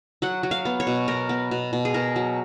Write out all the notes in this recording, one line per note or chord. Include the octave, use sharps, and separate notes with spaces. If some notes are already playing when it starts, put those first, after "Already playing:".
F#3 F#5
F#3
F5
B3
C#5
B2
B2 A#4
B3
B2
B2
G#4
B2 A#4
F#3